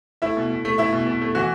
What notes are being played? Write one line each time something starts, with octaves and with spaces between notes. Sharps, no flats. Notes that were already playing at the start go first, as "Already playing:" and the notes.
A3 E4 E5
B2
B2
A3
A3 E4 E5
B2
B2
A3
E3 F#4